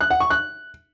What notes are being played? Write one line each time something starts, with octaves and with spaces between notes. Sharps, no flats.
F#6
F#5
C#6
F#6